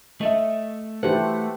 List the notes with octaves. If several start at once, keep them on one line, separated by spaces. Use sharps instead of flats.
A3 A4 D#5 E5
E3 A3 F#4 G4 B4 C5 F#5